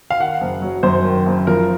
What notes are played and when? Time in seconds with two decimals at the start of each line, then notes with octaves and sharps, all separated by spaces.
0.10 F5
0.20 D#3 F#5
0.41 F#1
0.62 F#3
0.83 F#2 C5
1.05 D#3
1.26 F#1
1.47 F3 A#4